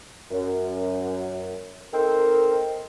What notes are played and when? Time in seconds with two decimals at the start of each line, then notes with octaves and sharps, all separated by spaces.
0.31 F#2
1.93 C4 D#4 A4 A#4 C5 G5